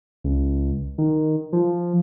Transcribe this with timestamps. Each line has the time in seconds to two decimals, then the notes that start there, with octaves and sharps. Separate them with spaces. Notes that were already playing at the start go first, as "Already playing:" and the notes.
0.24 C#2
0.98 D#3
1.53 F3